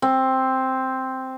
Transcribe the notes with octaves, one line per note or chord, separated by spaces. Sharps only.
C4